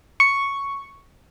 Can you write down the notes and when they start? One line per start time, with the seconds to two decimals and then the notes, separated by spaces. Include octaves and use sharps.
0.20 C#6